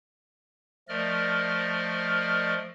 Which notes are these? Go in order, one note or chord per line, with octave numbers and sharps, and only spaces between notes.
F3 A3 A#4 D5 D#5 F6